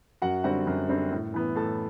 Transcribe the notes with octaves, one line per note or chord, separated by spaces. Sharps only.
F#2 F#4 F#5
D3 G3 C4 F#4 F#5
F#2
D3 G3 C4
A2
E3 B3
A2 A4 A5